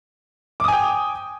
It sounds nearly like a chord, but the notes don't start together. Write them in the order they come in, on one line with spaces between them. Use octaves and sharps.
D6 D#6 G#5 G5